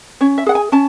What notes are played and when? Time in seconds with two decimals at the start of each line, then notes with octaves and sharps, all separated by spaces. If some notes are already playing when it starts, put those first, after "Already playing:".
0.21 C#4 C#5
0.38 E5
0.46 G#4 F#5
0.55 G#5
0.72 C#4 A5